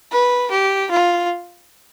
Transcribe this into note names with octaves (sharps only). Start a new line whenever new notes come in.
B4
G4
F4